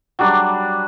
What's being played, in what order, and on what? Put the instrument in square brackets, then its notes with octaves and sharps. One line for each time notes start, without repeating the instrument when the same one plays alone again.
[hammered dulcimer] F#3 G3 D4 D5